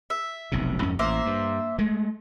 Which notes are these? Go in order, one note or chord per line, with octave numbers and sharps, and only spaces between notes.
E5
F1 B1 C3
F2 G#2 C#4
A1 A#3 C5 E5
G2
G#3 A3